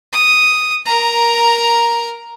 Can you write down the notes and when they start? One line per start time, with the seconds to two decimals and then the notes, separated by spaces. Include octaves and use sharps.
0.13 D#6
0.86 A#4 A#5